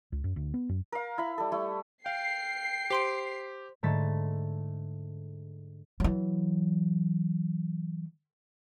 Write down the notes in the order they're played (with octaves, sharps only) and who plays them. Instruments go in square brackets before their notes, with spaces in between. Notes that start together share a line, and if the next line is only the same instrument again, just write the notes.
[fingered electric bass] C#2
F#2
D2
B3
F#2
[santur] A#4 F5
E4 B5
G3 A4
G3 A3 E4
[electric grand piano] F5 [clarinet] G5 [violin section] C7
[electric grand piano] G4 [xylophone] C5 C6 D7
[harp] G#2 D3 A3 A6 B6
[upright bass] E3 F#3